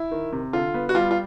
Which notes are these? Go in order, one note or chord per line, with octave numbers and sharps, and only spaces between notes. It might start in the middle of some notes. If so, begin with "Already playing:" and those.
Already playing: E4
D#3
C3
D3 F4
B3
F#4
G3 F4
F4